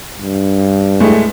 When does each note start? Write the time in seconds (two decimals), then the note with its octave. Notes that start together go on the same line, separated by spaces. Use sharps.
0.18 G2
1.00 A2 G#3 A3